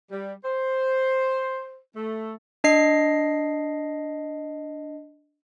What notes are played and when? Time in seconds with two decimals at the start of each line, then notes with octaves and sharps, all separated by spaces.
0.11 G3
0.44 C5
1.96 A3
2.64 D4 D#5 C7